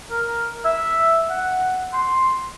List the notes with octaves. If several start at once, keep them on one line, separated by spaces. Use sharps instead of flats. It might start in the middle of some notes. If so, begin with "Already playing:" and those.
A#4
E5
F#5
C6